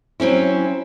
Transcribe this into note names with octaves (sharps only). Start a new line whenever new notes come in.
F#3 C4 C#4 E4